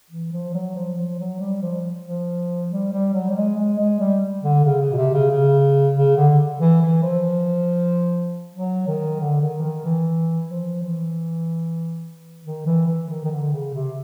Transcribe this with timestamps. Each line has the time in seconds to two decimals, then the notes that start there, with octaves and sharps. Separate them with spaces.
0.10 E3
0.33 F3
0.54 F#3
0.75 F3
0.98 F3
1.19 F#3
1.40 G3
1.62 F3
2.06 F3
2.70 G3
2.93 G3
3.14 F#3
3.30 G3
3.36 G#3
3.56 G#3
3.78 G#3
4.00 G3
4.43 D3
4.65 C#3
4.81 C#3
4.92 B2
4.97 C3
5.13 C#3
5.31 C#3
5.95 C#3
6.16 D3
6.61 E3
6.82 E3
7.03 F3
8.54 F#3
8.87 D#3
9.20 D3
9.41 D#3
9.59 E3
9.62 D#3
9.85 E3
10.50 F3
10.82 E3
12.45 D#3
12.66 E3
12.87 E3
13.09 D#3
13.25 D#3
13.31 D3
13.53 C#3
13.74 C3